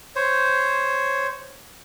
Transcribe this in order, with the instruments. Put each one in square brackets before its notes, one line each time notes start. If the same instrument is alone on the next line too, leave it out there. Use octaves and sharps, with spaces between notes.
[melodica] C5 C#5